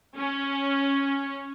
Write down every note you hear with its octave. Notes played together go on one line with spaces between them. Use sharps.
C#4